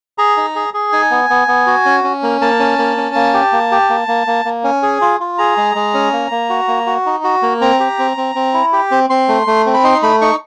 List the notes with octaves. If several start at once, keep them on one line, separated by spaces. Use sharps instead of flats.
G#4 A#5
D#4
G#4
G#4
D#4 G#5
B3
B3
B3
F#4
C#4
C#4
A#3
A#3 A5
C#4
A#3
C#4
A#3
G4
A#3
G4
A#3
A#3
A#3
A#3
C#4
G#4
F4
F4
G#4 A#5
G#3
G#3
C#4
A#3
A#3
F#4
A#3
F#4
D#4
F#4
A#3
C4 A#5
G4
C4
C4
C4
E4
G4
C4
C4 C6
A3
A3
C4
B5
D#4 C6
A3 B5
D#4 C#6